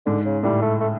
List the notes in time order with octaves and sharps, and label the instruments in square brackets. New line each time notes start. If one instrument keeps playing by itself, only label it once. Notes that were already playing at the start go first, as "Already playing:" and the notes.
[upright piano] G#2 [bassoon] D3
[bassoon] C#3
[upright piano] A2 [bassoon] G3
[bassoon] A3
A3